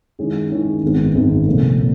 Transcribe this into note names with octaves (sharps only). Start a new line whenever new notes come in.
D#3 G#3 C#4 E4 G#4
D#3 G#3 C#4 E4 G#4
G#1 F#2 D#3 G#3 B3
G#1 F#2 D#3 G#3 B3
C2 A#2 F3 A3
A#2